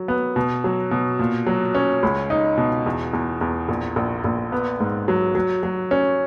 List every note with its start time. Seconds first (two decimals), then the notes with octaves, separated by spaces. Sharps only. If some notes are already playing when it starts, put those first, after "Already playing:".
Already playing: F#3
0.08 B3
0.36 B2
0.64 F#3
0.91 B2
1.19 A#2
1.47 F#3
1.75 C#4
2.03 C#2
2.30 D#4
2.57 B2
2.86 E2
3.13 E2
3.41 E2
3.69 A#1
3.96 A#1
4.24 A#1
4.52 B3
4.80 G#2
5.08 F#3
5.35 F#3
5.63 F#3
5.91 C#4